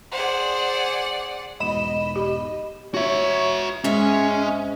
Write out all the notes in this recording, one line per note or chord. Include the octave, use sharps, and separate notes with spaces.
G#4 C5 D5 F#5
E1 G#2 B2 D#5 B5 E7
G4
F#4 C#5 E5
G#2 G#3 C#4 E5